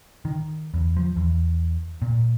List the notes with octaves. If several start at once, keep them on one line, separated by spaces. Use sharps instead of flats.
D#3
E2
F3
E2
A#2